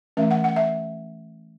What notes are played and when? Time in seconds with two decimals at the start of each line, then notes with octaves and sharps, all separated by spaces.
0.17 E3 A3 C#4 E5
0.31 F#5
0.44 F#5
0.56 E5